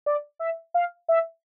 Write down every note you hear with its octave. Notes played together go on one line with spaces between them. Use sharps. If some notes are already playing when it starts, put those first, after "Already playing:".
D5
E5
F5
E5